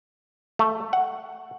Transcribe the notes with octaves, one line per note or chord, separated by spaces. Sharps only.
A3
F#5